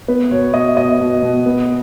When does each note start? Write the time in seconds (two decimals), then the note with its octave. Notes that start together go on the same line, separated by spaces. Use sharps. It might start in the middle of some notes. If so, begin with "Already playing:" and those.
0.08 B3 B4
0.31 B2 C#5
0.54 B2 D#5
0.77 B2 D#5
1.00 B2
1.23 B2
1.46 B3